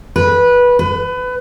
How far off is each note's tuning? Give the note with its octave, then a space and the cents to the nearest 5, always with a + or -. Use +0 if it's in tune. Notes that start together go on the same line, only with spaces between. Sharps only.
B4 -15
B4 +25